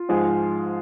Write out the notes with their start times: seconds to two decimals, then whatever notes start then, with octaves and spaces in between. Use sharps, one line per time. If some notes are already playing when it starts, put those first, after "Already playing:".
Already playing: F4
0.09 G#2 F3 G#3